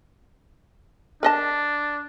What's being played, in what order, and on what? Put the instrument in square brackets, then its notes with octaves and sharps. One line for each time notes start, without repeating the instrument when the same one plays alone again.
[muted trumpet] D4 [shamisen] A#4 D#5 A5